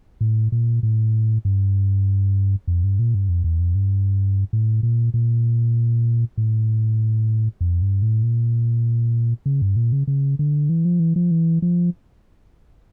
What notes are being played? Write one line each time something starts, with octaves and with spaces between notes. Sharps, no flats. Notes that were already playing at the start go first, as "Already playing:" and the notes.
A2
A#2
A2
G2
F2
G2
A#2
G2
F2
E2
F2
G2
A2
A#2
A#2
A2
F2
G2
A2
A#2
C#3
G2
A#2
C#3
C#3
D3
E3
F3
E3
F3
E3
F3